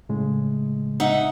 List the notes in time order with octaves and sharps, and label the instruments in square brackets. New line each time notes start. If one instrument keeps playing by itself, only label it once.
[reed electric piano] A2 C#3 G#3
[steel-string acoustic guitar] D#4 E5 F#5